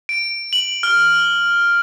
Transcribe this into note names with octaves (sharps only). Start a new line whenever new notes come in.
D7
F#7
F6